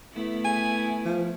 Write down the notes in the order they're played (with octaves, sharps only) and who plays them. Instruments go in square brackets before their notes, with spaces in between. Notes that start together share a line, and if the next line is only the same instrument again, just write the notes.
[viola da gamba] A3 B3 E4
[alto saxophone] G#5
F3